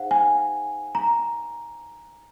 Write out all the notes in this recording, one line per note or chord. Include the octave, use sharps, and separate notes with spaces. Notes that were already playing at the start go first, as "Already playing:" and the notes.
Already playing: D#4 G#4 C5 F5 F#5
G#5
A#5